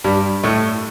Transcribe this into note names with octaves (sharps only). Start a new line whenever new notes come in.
G2 G3
A2 A3